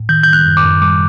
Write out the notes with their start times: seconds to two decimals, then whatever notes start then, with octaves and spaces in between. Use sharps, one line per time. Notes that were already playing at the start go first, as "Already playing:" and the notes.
Already playing: A2
0.09 D#3 G6
0.23 D#3 G6
0.33 F#6
0.45 F#2
0.57 D6
0.64 F#2
0.82 G3 D6